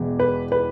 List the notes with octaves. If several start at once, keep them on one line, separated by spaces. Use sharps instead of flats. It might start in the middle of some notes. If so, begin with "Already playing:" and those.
Already playing: E1 E2 E3
B4
B4